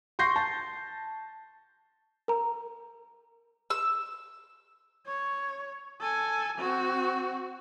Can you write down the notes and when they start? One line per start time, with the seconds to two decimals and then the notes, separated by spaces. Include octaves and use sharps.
0.19 C6 C#6 G6 A#6 C7
0.36 A5
2.28 A#4 A#5
3.70 E6
5.07 C#5
6.00 A4 G#5
6.58 C4 F#4